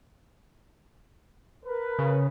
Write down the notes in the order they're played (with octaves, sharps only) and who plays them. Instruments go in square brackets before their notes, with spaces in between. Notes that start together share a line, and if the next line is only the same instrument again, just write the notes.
[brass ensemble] A#4 B4
[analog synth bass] C#3